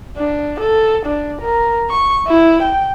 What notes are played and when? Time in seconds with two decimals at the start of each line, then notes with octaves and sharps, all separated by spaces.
0.16 D4
0.61 A4
1.06 D4
1.42 A#4
1.90 C#6
2.28 E4
2.63 G5